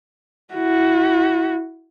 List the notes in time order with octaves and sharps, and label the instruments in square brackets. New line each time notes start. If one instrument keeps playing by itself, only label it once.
[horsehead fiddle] E4 F#4